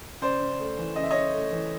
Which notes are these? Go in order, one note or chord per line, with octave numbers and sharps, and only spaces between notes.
C#3 C5 D5
C#3
A3
E3
C#3 D#5
E5
C#3 C#5 D#5
A3
E3